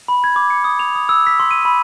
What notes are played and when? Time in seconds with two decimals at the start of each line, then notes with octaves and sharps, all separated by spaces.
0.08 B5
0.24 G#6
0.36 D6
0.50 C#7
0.64 D#6
0.79 F7
0.95 D#6
1.09 E6
1.27 B6
1.40 C6
1.51 D#7
1.65 B5